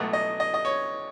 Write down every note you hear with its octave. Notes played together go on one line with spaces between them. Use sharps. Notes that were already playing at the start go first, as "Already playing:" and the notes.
Already playing: C#2 B2 F#3 A3 F#5
D#5
D#5
D#5
C#5